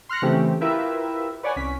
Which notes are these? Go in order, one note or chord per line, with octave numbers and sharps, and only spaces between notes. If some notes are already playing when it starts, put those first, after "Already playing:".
C6 F6 F#6 A#6 C#7
C#3 E3 A3 C4 C#4 G4
E4 F4 G4 A#4 B4 E5
B4 C#5 D5 F#5 G#5
C2 C#4 B6